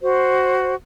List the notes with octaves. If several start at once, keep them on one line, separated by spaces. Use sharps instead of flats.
F#4 C5